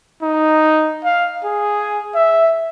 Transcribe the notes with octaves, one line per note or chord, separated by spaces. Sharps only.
D#4
F5
G#4
E5